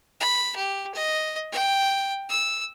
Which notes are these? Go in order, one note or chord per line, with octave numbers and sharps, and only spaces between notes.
B5
G4
D#5
G5
E6